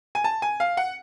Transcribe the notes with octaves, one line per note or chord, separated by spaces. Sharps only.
G#5
A5
G#5
F5
F#5